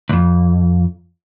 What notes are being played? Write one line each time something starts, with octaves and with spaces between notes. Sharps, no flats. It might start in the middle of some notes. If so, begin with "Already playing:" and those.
C2 F2